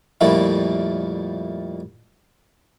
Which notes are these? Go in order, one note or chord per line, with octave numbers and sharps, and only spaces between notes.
F2 A#2 G3 A3 A#3 E4